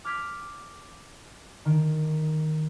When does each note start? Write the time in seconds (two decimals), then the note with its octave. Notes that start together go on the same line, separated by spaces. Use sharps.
0.05 D6 F6 G6 G#6 B6
1.65 D#3